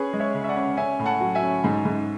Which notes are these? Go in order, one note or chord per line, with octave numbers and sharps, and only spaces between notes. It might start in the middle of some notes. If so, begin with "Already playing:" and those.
Already playing: C#4 G#4 B4
G#3
C#5 E5
C#3
E5
D5 F#5
C#4
C#4 E5 G#5
A2
F#5 A5
F#3
E5 G#5
C#4
G#2
G#2